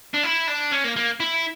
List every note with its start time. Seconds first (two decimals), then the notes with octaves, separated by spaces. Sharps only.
0.14 D4
0.23 E4
0.47 D4
0.72 C#4
0.84 A#3
0.96 A#3
1.20 E4